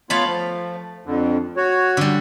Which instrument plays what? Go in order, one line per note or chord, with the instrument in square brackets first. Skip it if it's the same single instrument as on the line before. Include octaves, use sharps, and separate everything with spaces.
[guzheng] A3 F5 B5 [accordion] B3 F4 C#5
[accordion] F3
F2 D3
F#4 C#5
[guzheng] D3 G3